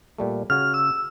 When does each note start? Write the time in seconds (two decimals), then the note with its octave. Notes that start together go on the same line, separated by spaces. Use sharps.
0.18 A#2 G3 A3
0.50 C#3 F#4 C#5 F6
0.74 E6